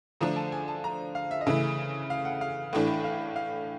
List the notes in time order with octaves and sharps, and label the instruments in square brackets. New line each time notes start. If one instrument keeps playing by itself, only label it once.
[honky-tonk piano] D3 F3 A3 D4 [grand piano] A#5
[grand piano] A5
G#5
A5
A#5
F5
E5
D#5
[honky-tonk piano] C#3 E3 A3 [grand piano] E5
[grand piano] F5
F#5
F5
[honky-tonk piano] A2 E3 A3 D4
[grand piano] F5
F5